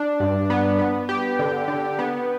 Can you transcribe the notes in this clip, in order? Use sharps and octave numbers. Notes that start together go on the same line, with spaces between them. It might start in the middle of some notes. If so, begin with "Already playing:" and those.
Already playing: D4
G2
B3
B3
G4
D3
D3
B3